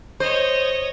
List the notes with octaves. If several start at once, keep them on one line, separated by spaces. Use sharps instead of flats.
C5 C#5 D#5